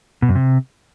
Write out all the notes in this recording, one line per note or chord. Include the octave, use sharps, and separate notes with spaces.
B2
F#2
C3